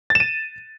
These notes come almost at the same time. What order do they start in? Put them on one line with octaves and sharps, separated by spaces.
A6 E7 D#7